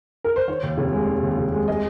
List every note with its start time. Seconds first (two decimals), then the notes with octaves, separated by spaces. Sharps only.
0.24 A#4
0.36 C5
0.48 D#3 C#5
0.63 D#2
0.78 F1
0.93 G#3
1.08 D#3
1.23 D#2
1.38 F1
1.52 G#3
1.68 G#3 D#5